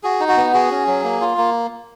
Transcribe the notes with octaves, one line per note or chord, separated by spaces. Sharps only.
F#4 G#4
D#4
F#4
B3
F#4 G#4
C#4
F#3
A#3
F4
A#3